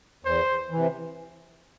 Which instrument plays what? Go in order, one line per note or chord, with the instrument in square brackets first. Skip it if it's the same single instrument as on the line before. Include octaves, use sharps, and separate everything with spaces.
[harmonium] E2 [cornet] C5
[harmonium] C3 E3